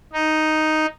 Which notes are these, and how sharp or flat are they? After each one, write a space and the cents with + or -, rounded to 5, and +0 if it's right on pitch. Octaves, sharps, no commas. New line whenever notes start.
D#4 +0